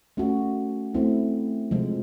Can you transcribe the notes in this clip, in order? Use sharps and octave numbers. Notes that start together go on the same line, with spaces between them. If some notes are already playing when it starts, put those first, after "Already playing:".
A3 C#4 F#4
A3 C4 E4
C3 F3 G#3